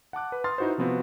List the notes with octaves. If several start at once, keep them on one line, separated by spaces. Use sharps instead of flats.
F#5 A5 D6 F#6
B4
C6 D#6 F6 A6
D#4 E4 F#4 B4 C5
C3 F3 B3 C4 F#4